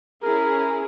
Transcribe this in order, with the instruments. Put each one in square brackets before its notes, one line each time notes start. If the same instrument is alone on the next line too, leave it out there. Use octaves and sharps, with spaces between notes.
[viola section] C#4 E4 G#4 [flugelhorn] A#4